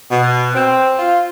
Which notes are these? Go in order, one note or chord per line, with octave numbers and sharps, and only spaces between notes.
B2
C4
F4